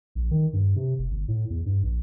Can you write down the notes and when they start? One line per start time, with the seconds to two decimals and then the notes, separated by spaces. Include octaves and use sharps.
0.15 A#1
0.31 D#3
0.53 G2
0.76 C3
0.99 F1
1.12 G1
1.28 A2
1.50 E2
1.66 G2
1.83 A#1